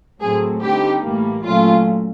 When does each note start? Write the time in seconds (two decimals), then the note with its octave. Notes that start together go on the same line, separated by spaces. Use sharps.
0.21 A2 F#3 A3 C4 G#4
0.62 D3 G3 C4 D#4 G4
1.03 A2 E3 G3 A#3
1.44 A#2 F#3 A3 C#4 F4